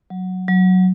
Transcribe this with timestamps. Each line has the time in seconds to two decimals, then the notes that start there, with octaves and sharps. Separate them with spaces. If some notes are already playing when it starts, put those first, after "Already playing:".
0.10 F#3
0.48 F#3